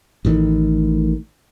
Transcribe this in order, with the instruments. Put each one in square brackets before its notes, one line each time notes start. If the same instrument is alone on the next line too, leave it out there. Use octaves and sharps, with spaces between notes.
[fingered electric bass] A1 A2 D#3